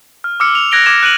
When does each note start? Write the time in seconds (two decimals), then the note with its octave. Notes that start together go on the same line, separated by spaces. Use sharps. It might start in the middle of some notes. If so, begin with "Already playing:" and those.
0.24 F6
0.40 D6 E6 F6 C#7
0.55 F7
0.72 F#6 G#6 A#6 D7 G7
0.86 D6 G#6 E7
1.03 F#6 D7 D#7 F#7